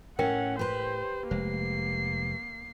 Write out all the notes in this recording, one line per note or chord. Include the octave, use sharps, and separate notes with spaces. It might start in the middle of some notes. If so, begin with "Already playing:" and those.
A2 C#4 A#4 F#5 G5
G4 B4 C5 C6
F1 G#3 A#3 C5 C7